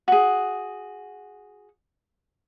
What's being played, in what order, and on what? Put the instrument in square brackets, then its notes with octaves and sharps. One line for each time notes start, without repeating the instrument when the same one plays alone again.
[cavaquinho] F#4 G#4